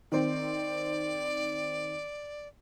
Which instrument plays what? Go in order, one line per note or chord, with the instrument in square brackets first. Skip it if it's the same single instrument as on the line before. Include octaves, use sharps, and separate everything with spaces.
[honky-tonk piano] D#3 C4 [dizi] D5